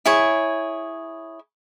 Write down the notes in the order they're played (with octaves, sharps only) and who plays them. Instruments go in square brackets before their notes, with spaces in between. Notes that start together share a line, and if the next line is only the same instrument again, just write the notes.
[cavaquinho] E4 G#4 C#5